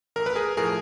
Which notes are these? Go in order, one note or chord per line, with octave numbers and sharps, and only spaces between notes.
A1 A#4
B4
G#4 A#4
A2 F3 G#4 A#4